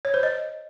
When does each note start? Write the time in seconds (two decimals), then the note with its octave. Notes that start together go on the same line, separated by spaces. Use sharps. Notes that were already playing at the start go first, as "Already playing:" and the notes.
0.05 C#5
0.14 C5
0.23 D#5